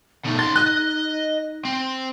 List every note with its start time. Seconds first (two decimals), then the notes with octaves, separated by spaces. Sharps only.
0.25 B2 A3 D#4
0.39 C#3 C6 A6
0.56 D#5 F#6
1.65 C4